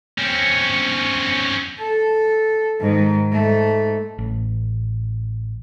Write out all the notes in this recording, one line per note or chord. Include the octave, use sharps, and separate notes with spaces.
C4 C#4
A4
G#2 D#3
G#2 A3
A1